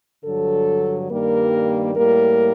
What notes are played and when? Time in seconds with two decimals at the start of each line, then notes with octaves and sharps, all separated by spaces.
0.25 G2 D3 F#3 A4
1.10 G2 D#3 G3 A#3 A#4
1.96 A2 G3 A#3 A#4